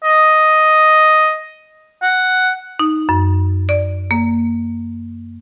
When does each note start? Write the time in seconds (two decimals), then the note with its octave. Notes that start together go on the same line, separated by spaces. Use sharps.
0.04 D#5
2.02 F#5
2.79 D#4
3.09 F#2
3.69 D5
4.11 A#3